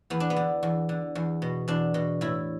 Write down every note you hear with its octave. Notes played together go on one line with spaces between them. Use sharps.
E2 B3
D4
B3
D3
E2
D3
E2
B2
E2 D4
B2
A2 E4